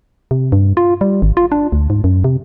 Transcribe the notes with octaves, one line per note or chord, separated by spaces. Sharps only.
C3
G2
F4
G3
G#1
F4
D4
D2
G#2
F#2
C3